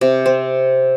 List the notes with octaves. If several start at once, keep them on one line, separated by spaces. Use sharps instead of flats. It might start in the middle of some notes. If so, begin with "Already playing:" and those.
C3
C4